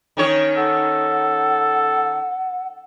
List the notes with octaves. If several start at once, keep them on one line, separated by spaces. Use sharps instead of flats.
D#3 C#4 C#5
A4 F#5